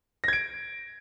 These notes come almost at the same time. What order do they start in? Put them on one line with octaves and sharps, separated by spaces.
A#6 G#6 D7